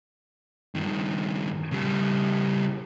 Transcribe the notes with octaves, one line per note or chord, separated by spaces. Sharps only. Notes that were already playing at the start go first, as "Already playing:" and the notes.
G2 D#3
C#3 G3